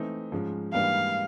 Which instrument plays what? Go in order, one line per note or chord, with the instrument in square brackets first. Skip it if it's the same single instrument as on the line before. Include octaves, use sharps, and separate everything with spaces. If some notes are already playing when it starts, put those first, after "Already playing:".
Already playing: [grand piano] E3 A3 C4 D#4
G#2 F3 G#3 C#4
[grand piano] G#2 E3 G3 A#3 D4 [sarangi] F5